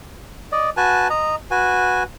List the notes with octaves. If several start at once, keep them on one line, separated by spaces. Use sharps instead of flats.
D5 D#5
F#4 B4 G#5 A5
D#5 A#5
F#4 B4 G#5